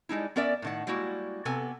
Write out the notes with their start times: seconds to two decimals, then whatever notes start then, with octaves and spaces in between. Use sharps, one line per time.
0.09 G3 G#3 D#4 E4
0.36 B3 C#4 A#4 D5 E5
0.62 A2 D#3 F#5
0.87 G3 G#3 A#3 E4 F#4
1.45 C3 B3 A4 G#5